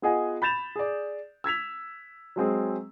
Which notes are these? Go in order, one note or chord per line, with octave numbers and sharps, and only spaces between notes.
B3 F4 G#4 D#5 F#5 G#5
B5 G6 A6 E7 F7
G#4 D5
E6 G#6 B6 F7
F#3 G#3 C4 G#4